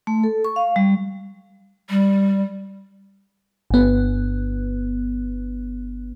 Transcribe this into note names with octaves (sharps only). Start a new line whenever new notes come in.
A3
A4
C#6
F5
G3
G3
G1 B3